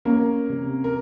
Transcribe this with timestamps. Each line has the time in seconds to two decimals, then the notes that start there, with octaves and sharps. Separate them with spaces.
0.05 A#3 C#4 A#4
0.49 C3
0.84 A#4